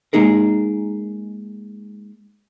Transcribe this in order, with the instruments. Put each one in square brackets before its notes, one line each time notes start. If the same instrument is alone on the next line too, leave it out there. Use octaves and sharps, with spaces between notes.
[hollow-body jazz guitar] G#3 A#3 D#4 G#4 A#4